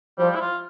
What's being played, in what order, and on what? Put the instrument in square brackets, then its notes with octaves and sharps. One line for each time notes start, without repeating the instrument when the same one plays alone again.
[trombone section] F3 [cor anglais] G3
[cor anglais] E4
F4